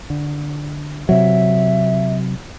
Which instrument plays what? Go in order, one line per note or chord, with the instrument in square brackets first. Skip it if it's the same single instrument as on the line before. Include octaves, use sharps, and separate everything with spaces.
[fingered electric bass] D3
[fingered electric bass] C3 F#3 [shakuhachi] E5